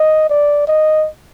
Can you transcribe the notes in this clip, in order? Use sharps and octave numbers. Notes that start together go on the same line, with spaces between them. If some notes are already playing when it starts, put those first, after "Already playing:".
Already playing: D#5
D5
D#5